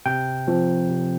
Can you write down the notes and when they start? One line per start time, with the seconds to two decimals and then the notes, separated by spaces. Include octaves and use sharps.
0.06 C3 G5
0.47 F3 C4
0.89 C3